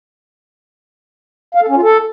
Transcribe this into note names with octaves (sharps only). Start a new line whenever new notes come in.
F5
A4
C#4
F4
A4